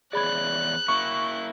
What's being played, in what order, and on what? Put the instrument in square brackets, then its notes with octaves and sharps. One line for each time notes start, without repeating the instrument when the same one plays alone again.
[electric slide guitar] E2 C#5 D5 [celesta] G#4 B5 G#6 [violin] F#6
[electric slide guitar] A#3 E4 [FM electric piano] C#6